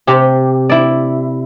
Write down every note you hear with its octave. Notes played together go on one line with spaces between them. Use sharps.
C3 G4
E4 D5